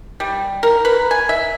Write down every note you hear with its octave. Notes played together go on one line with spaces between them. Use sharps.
G3
A#4
B4
G#5
E5